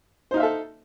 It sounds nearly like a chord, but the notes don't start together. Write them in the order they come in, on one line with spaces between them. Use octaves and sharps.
C5 D#4 F5 E5 A4